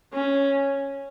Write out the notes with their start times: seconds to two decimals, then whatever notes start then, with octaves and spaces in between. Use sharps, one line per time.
0.13 C#4